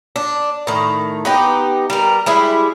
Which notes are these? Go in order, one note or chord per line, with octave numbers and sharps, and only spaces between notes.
D4
A2 D#3
B3 D#4 G4
G3 A#4
G3 G#3 E4